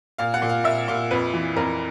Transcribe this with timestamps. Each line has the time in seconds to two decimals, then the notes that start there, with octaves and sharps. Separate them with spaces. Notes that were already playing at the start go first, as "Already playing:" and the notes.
0.18 A#2 F5
0.34 F#5
0.42 A#2
0.49 F5
0.64 A#2 E5
0.88 A#2 F5
1.11 F2 B4
1.33 E3
1.56 F2 A#4